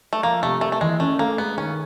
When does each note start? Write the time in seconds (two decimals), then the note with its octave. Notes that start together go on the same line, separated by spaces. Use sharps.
0.13 A3
0.23 F3 A#3
0.42 C3 A3
0.61 A3 A#3
0.72 A3
0.81 E3 G#3
1.00 A3 C#4
1.19 A3 A#3
1.38 G#3 B3
1.57 D#3 C#4